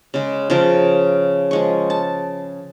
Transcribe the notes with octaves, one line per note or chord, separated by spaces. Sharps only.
C#3 G#3
C#3 F3 A#4
F3 G#3 C#6
A5